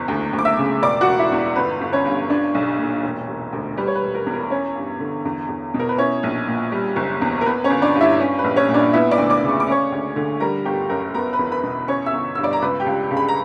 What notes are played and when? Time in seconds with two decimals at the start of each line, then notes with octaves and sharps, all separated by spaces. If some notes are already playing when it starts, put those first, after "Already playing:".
Already playing: F#1 E2
0.08 D2
0.33 D2
0.39 D6
0.45 E5 E6
0.58 C#3
0.82 E1 D5 D6
1.01 F#4 F#5
1.07 E1
1.19 E4 E5
1.32 E2
1.56 G1 B4
1.81 G1
1.93 C#4 C#5
2.05 G2
2.30 D4
2.54 B1
2.79 A#2
3.03 E1
3.28 E1
3.53 D2
3.77 G3 B4
3.87 C#5
3.95 B4
4.02 E1
4.15 A#4
4.26 E2
4.33 A#4
4.50 C#4 C#5
4.76 G2
5.00 D3
5.25 E2
5.49 E2
5.74 B2
5.79 A#4
5.89 B4
5.98 C#4 E4 C#5
6.23 A#1
6.47 A#2
6.72 G3
6.96 F#1
7.21 E2
7.41 A#4
7.46 B3 B4
7.64 C#4 C#5
7.70 G1
7.82 D4 D5
7.95 G2
8.01 E4 E5
8.20 C#4
8.39 B4
8.44 A#1
8.56 C#4 C#5
8.68 A#2
8.74 D4 D5
8.93 B3 E4 E5
9.11 D5 D6
9.18 D2
9.30 D5 D6
9.43 C#3
9.49 C#6
9.60 D6
9.67 C#4 C#5 C#6
9.92 D2
10.16 D3
10.40 G3 A#4 A#5
10.65 G1 G4 G5
10.89 F#2 A#4 A#5
11.14 B3 A#4 A#5
11.33 B4 B5
11.39 E2
11.51 B4 B5
11.63 B2
11.88 C#4 C#5 C#6
12.06 E5 E6
12.13 G1
12.35 G2 E6
12.43 D5 D6
12.53 A#5
12.62 C#2 B4 B5
12.80 G4 G5
12.86 C#2
13.11 C#3
13.17 B5
13.28 A#5